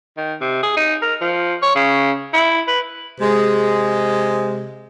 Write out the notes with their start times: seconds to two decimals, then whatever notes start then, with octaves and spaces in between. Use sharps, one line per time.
0.17 D#3
0.41 C3
0.63 G#4
0.77 D#4
1.02 A#4
1.21 F3
1.62 C#5
1.75 C#3
2.33 E4
2.68 B4
3.21 C3 G#3